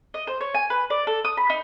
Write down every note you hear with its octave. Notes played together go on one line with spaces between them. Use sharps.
D#5
C5
C#5
G#5
B4
D5
A4
D#6
B5
D#4